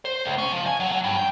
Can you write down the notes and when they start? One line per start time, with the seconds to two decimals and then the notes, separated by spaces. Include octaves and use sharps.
0.05 C5
0.25 C#2
0.38 C#4
0.52 F3
0.67 G#5
0.80 F#3
0.91 F#3
1.04 G2
1.17 G5